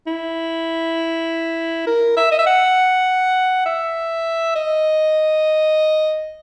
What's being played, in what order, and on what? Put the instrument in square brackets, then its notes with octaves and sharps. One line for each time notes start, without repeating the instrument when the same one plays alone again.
[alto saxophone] E4
A#4
E5
D#5
E5
F#5
E5
D#5